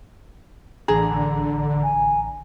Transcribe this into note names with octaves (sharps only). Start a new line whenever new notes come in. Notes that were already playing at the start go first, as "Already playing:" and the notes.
A1 D3 G#4 A#5
G#5